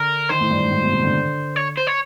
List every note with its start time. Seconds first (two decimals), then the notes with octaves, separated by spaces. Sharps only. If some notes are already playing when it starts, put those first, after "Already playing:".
Already playing: D3 A#4
0.29 D#3 C5
0.41 A2
0.51 G2
0.61 G#2
0.72 A2
0.82 B2
0.93 C3
1.03 D3
1.56 C#5
1.77 C5
1.87 C#5